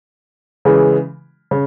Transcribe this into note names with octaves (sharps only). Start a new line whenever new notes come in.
C#3 E3 G#3
C#3